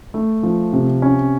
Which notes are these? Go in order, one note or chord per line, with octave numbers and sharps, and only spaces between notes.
A3
F3
C3
C#4